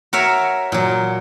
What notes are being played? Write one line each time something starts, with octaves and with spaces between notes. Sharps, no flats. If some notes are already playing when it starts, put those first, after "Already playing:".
F#4 A#4 C#5 E5
A#2 F#3